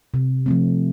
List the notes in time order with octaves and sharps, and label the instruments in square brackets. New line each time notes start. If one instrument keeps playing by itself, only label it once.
[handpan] C3
F3 A3 C4